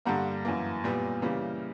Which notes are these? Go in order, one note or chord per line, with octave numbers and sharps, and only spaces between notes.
G2 D3 G3 A#3 F#5 A#5
F#2 E3 A#3
A#2 G3 B3
C#3 E3 G3 A#3